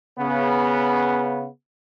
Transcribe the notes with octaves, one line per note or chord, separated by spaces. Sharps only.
C#3 B3